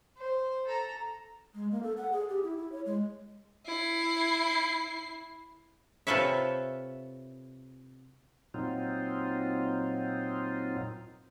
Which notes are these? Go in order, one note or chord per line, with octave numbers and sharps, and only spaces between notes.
C5
A4 A#5
G#3
A#3
A4
F#5
G#4
G4
E4
E4
C#5
G#3
E4 C7
C3 F4 A4 B4 C#5 E5
A#2 F#3 C4 D#4 F4